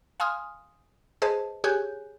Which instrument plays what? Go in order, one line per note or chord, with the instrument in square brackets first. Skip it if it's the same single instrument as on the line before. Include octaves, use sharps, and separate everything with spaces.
[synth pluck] F5 G#5 C6 D#6 F6
G#4 B4 C5 D#5 A5
G4 G#4 C#5 G#5 F#6 G6